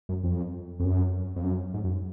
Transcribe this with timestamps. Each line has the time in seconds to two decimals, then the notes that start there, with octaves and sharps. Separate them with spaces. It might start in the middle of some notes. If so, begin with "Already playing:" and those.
0.09 F#2
0.24 F2
0.80 F2
0.85 F#2
1.36 F2
1.44 F#2
1.74 G#2
1.84 F#2